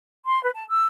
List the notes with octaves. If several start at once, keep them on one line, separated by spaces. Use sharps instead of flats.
C6
B4
A5
E6